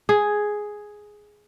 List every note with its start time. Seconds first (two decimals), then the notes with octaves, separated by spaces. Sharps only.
0.09 G#4